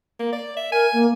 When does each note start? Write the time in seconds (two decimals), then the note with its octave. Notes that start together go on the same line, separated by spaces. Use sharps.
0.19 A#3
0.32 D5
0.56 E5
0.72 A#4 G#5
0.93 A#3